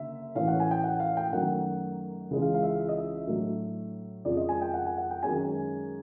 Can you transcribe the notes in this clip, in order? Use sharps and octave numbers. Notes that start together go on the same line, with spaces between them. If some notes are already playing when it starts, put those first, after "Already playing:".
Already playing: F#1 F#2 D3 E5
A2 E3 A3 C#4 F5
F#5
G#5
G5
F#5
F5
G5
F#2 D#3 F#3 A3 F#5
C#2 C#3 E3 G#3 C#4
F5
F5
E5
F5
E5
D#5
E5
A2 F#3 A3 D4
F2 C#3 F3 G#3 C4 D5
D#5
G#5
G5
F#5
G#5
F#5
G5
F#2 D#3 G#3 C#4 G#5